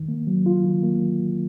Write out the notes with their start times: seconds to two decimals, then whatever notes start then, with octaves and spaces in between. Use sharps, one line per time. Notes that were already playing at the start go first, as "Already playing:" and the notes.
Already playing: D#3
0.08 A#3
0.27 F#3
0.46 F4
0.64 D#3
0.83 A#3